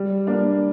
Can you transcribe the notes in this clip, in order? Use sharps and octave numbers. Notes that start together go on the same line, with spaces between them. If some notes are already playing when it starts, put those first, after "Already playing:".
Already playing: G3
A#3 D4